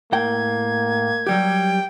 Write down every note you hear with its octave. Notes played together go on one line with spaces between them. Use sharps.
A2 A#3 F#5 G5 G#6
F#3 G3 G4 G5